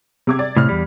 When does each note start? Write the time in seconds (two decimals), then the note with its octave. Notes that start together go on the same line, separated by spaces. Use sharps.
0.27 C3 D6 G#6
0.39 D5
0.57 A2 C3 B5 F6
0.69 E2 G3